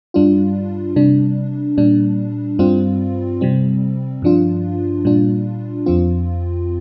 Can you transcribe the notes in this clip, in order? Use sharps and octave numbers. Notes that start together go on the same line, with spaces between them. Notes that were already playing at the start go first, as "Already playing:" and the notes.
G2 G3 D4 F4
C3 G3 D4
A#2 G3 D4
G2 G3 C4 F4
C3 G3 C4
G2 F3 D4 F4
A#2 G3 D4 F4
F2 F3 C4 F4